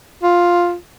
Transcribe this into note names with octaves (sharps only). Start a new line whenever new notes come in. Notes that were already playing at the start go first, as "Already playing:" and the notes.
F4